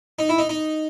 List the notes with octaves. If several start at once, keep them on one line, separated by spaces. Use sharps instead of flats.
D#4
E4
D#4
D#4